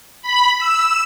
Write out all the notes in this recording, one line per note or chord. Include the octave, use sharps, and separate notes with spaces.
B5
E6